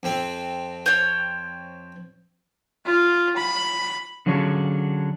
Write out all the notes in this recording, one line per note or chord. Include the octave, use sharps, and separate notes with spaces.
F2 C4
C5 C#5 G5
F4
B5
D3 F3 F#3 C#4 D4 G#4